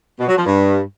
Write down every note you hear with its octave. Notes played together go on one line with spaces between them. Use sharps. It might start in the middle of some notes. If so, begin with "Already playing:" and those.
B2
F#3
F3
G2